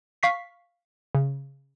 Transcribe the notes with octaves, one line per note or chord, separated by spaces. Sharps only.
F5 C#6 B6 C7
C#3